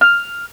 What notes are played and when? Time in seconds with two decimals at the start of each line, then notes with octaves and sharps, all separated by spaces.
0.01 F6